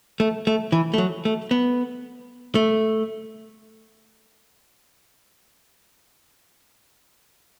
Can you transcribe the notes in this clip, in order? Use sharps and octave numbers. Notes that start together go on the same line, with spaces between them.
A3
A3
E3
A3
F#3
A3
B3
A3